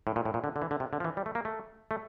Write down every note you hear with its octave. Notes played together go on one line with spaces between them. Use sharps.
A2
A#2
A2
A#2
D3
D3
E3
D3
C3
D3
F3
E3
G3
A3
A#3
A3
A3